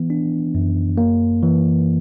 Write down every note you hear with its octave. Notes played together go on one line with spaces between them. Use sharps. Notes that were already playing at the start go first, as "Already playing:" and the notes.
Already playing: E3 B3
D4
F#2
A#3
E3